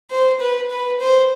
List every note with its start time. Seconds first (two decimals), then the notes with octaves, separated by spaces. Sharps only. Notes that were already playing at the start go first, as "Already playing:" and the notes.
0.11 C5
0.40 B4
0.70 B4
1.00 C5